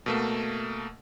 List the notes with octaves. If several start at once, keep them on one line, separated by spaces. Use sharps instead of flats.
B2 A3 A#3